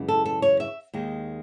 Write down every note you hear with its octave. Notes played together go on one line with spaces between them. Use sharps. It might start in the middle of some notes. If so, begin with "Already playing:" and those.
Already playing: F#2 C#3 E3 G#3
A4
A4
C#5
E5
D#2 D#3 G#3